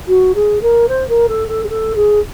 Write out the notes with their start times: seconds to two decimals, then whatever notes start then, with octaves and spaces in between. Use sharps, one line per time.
0.08 F#4
0.35 G#4
0.61 A#4
0.88 C5
1.08 A#4
1.28 A4
1.48 A4
1.64 G#4
1.69 A4
1.95 G#4